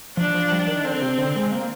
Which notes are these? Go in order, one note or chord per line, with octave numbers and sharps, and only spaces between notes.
F3 D4
F3
G3
D#3
D3 C4
C3
D3
G#3
A#3